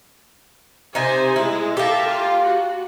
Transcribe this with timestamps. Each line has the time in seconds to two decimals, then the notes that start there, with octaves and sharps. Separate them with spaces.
0.95 C3 D#4 C5 G#5
1.36 G#3 E4
1.77 A#3 G4 A4 E5 A5
2.06 F4
2.43 F#4